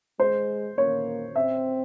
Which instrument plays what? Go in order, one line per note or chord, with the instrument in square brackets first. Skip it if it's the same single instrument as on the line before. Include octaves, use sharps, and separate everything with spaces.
[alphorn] G#3 [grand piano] C5
[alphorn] A#3 [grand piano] C#5
[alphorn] C4 [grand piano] E5